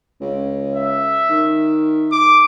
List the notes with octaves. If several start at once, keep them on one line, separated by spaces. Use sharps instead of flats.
C#2
E5
D#3
D6